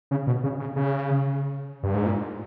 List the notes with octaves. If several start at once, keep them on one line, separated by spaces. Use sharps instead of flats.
C#3
B2
C#3
C#3
C#3
G2
G#2
A#2